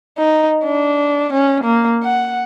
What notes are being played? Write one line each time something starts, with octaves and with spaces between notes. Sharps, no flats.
D#4
D4
C#4
A#3
F#5